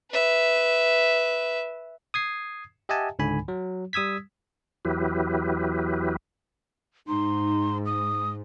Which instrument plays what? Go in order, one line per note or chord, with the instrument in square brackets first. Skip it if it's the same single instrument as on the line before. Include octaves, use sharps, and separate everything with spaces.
[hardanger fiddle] B4 E5
[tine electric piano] D#6 G#6 C7
G4 D#5 E5 F#5 G#5 A5
C#2 G#2 D3 G#5 B5
F#3
G3 D#6 E6 G#6 B6
[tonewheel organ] E2 F#3 E4 G4 B4
[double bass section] G#2 [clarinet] D#4 [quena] C6
[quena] D#6